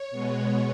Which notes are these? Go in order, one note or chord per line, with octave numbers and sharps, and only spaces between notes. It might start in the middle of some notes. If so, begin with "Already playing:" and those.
Already playing: C#5
B2 G#3 B3